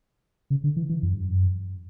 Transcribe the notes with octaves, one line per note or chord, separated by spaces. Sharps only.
C#3
D3
E3
E3
F#2
G2
F#2